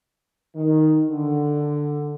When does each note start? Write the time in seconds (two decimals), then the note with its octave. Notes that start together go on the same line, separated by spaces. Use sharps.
0.55 D#3
1.10 D3